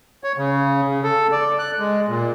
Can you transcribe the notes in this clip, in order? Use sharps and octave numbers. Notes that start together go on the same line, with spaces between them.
C#5
C#3
C#3
A4
D5
F#6
G#3
A#2